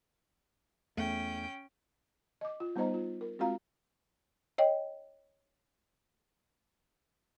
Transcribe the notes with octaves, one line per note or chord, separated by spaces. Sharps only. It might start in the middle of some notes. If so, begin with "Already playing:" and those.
E2 A3 C#4 G5
D#5 D6
F4
G3 B3 D#4 C5 D#5 A#5
F4
A#4
G#3 C4 F4 F#4 F5 A#5
C#5 D#5 G5